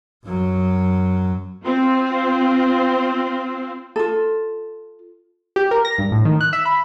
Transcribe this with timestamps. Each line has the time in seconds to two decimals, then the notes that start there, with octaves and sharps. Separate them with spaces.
0.25 F#2 F#3
1.64 C4 F4
3.96 F4 A4
5.56 G4
5.71 A#4
5.85 A#6
5.98 G2
6.12 A2
6.25 D#3
6.41 F#6
6.53 E5
6.65 B5